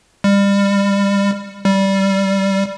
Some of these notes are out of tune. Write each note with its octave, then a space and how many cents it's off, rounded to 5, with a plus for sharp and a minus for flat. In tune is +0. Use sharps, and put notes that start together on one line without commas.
G3 +30
G3 -10